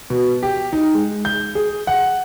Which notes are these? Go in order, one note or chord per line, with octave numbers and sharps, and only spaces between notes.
B2
G4
D#4
G#3
G6
G#4
F#5